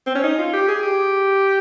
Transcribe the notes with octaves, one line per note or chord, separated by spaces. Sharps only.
C4
C#4
D#4
F4
G4
G#4
G4